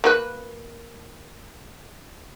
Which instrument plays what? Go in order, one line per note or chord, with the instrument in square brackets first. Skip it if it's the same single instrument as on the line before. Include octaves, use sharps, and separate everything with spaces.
[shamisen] A#3 F#4 B4